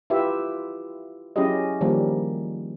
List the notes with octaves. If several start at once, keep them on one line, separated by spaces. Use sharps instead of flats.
E4 F4 G4 B4 E5
F#3 C#4 E4 G4 G#4 D#5
D#3 F3 G3 A#3